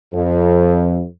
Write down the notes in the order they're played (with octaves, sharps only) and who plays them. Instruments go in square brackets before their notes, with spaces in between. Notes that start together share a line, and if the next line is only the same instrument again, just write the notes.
[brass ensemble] F2